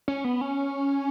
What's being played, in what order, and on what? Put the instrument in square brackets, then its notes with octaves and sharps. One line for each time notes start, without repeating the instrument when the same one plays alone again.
[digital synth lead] C#4
B3
C#4